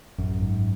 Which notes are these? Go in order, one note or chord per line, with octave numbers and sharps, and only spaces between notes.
A1 F#2
G#2